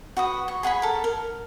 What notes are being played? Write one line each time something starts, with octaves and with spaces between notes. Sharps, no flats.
F#4 B4 D#6
C#6
G#4 F#5 G#5 B5
A4 A#4
A#4